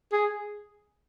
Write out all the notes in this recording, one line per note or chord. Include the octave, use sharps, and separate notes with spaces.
G#4